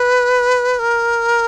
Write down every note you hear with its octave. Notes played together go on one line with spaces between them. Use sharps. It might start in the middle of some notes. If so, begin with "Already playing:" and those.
Already playing: B4
A#4